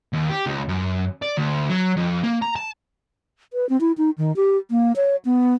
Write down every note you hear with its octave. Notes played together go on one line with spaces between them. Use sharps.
D#2
G4
C#2
F#2
D5
D2
F#3
F2
A#3
A#5
A5
B4
C4
E4
D#4
D#3
G4
A#3
C#5
B3